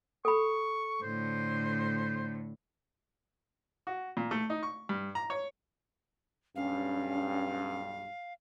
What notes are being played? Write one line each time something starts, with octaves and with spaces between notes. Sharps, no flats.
A4 B5 C#6
A2 D3 C5
F#4
A#2
A3
D#4
C#6
G2
A#5
C#5
B1 G2 C#4 F5